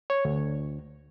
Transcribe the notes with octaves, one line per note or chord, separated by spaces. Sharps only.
C#5
D2